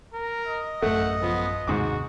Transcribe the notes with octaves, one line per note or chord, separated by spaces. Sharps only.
A#4
D#5
A1 F#2 A3 F#5
F3 B3
D#2 G#2 C3 F#4 D6